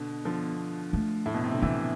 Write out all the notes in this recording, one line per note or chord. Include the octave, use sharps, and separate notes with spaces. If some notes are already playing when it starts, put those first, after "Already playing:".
Already playing: B2 D3 B3
D3 F3
A3
A2
B2
C3
D3
C3 E3 B3